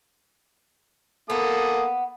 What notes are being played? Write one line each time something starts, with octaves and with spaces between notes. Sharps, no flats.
A#3 B3 A4 D#6